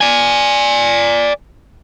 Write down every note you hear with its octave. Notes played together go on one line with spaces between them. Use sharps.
D5 G#5